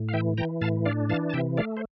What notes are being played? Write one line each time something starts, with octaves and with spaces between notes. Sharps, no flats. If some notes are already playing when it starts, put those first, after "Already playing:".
Already playing: A2
F5
E3 E5 G5
E3 G5 A#5
A2 F5 A5
D4 D5 F5
E3 F5 A5
A5
C3 E5 G5
A3 D5 F5
C5